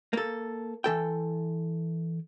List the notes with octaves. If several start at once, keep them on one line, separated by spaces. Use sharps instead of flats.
A#3 A4
E3 A4 G5